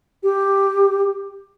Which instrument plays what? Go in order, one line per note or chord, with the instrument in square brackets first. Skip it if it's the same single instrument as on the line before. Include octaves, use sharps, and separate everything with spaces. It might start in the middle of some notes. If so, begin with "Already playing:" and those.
[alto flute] G4